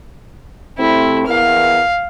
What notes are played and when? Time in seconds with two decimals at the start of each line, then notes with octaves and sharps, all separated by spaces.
0.79 C3 A3 C4 E4
1.27 E2 A#4 F5